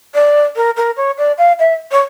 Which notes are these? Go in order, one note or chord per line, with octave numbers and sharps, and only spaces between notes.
D5
A#4
A#4
C#5
D5
F5
E5
C#5